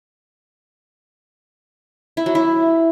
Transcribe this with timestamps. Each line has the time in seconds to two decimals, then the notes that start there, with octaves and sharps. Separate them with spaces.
2.17 E4
2.26 F#3
2.35 E4